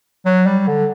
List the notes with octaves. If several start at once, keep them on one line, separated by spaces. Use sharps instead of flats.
F#3
G3
D3